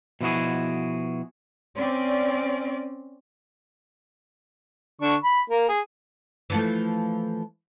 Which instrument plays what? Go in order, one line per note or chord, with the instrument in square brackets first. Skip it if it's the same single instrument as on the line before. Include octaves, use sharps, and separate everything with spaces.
[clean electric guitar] B2 F3 E4 F#4 G#4
[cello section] C4 C#4 D5
[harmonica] D3 D4 C#6
B5
A#3 A#4
G#4
[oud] E3 F3 A3